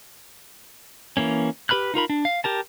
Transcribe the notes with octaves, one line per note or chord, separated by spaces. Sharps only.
E3 A#3 C#4
G4 B4 B5 F6 F#6
D#4 F4 A#4 B5
D4
F5
G4 A#4 A5